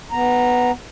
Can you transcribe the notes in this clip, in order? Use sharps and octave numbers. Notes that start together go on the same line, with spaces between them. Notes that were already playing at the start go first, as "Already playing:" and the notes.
B3 A#5